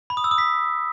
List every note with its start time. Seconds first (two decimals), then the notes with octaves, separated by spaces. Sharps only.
0.10 B5
0.17 D#6
0.24 E6
0.31 D#6
0.38 B6